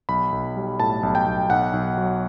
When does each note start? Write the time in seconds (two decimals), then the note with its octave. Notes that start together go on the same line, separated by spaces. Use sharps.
0.09 B1 B5
0.32 B1
0.56 G3
0.80 A2 A5
1.03 B1
1.15 G5
1.26 B1
1.50 B1 F#5
1.73 B1
1.97 F#3